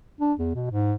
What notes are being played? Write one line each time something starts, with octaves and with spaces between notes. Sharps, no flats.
D4
E2
B2
G#2